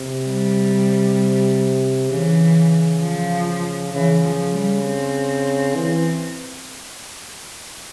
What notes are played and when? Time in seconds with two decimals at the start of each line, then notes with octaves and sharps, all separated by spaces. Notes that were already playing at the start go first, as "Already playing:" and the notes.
Already playing: C3
0.27 G3
2.09 C#3 E3
3.01 F3
3.93 C#3 E3
4.23 F3
4.54 G3
4.84 C4
5.75 E3